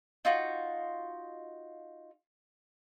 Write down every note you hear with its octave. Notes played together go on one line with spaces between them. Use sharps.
D#4 F4 F#4